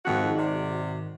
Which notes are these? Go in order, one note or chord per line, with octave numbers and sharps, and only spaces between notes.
F2 G#2 D#3 F4 F#4 F#5
C3 D5